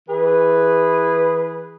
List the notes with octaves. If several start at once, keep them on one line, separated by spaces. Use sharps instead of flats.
E3 G#4 B4